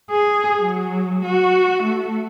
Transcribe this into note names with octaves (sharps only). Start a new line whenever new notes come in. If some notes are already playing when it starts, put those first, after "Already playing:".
G#4
F#3
F#4
A3